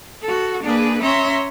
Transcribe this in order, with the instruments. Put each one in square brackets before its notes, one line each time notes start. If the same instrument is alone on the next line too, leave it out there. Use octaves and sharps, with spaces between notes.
[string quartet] F#4 A4
A#3 D4 G#4 B4
C#4 C#5 E5 A#5 C6 A#6